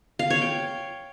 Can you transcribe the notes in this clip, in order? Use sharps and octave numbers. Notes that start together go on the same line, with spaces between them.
F5
C#5
G5